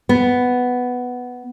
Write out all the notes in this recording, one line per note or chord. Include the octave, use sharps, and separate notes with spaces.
B3